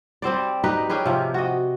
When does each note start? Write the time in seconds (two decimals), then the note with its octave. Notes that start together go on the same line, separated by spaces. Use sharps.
0.22 G3 C4 C5 D5
0.64 D#4 G4 B4
0.89 C#4 G4 G#4 B4
1.06 C3 F3
1.34 F#4 D#5